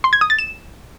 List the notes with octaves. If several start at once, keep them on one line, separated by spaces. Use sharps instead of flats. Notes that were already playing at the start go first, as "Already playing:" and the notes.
C6
G#6
D#6
A6
E7